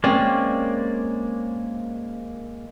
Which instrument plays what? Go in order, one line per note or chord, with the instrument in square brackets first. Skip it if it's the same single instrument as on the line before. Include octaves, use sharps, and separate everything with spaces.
[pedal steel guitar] G#3 A#3 D5 [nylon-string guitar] C4 C#4